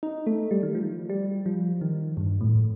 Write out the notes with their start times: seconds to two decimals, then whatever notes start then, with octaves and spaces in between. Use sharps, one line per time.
0.03 D#4
0.27 A3
0.51 G3
0.63 D#3
0.75 F3
1.10 G3
1.46 F3
1.81 D#3
2.17 G2
2.41 A2